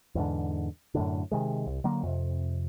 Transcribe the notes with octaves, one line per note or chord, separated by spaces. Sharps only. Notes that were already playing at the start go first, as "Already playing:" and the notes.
E2 G#2 D3
F#2 A2 D3
C3 D#3 G#3
C2
D3 F#3 A#3
F2 C3